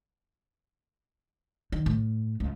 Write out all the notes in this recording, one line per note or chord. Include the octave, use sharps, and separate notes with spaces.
D#3
A2
C#2